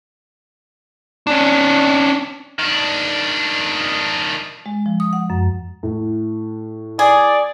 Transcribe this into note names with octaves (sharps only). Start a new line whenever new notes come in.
C#4 D4
D#3 D4
G#3
F3
D#6
F#5
F#2
A2
G#4 D5